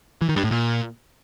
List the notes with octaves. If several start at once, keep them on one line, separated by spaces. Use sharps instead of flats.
E3
D#3
G2
A2
A#2